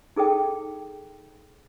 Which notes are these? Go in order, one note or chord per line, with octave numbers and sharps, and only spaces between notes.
D#4 G#4 A4 G5